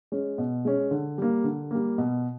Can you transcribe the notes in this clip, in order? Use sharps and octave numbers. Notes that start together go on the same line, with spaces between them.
G#3 C#4
B2
G#3 C#4
D3
G3 A#3
D3
G3 A#3
B2